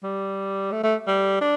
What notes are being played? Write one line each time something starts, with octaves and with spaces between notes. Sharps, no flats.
G3
A3
A3
G3
D4